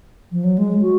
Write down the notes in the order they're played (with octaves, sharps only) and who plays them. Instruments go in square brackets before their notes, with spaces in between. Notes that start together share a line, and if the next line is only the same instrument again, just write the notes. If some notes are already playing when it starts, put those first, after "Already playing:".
[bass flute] F3
F#3
G#3
F#4